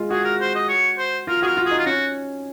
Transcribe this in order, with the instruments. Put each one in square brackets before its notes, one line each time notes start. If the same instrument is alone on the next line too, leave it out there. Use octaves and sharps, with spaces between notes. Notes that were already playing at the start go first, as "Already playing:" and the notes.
Already playing: [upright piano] G#3 F4
[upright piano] F#4 [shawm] G#4
[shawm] A#4
C5
D#5
C#5
C5
[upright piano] F4 [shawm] A#4
[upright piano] F#4 [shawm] G#4 A#4
[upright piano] F4
[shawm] G#4
[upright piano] D#4
[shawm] F4
[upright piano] C#4 [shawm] F#4